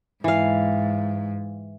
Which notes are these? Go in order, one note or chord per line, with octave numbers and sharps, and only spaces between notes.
G#2 E3 F5